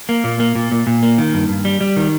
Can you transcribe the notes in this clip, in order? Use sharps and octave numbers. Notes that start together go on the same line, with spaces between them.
A#3
A#2
A#3
A#2
A#2
A#2
A#3
D#3
G2
G2
G3
G3
D#3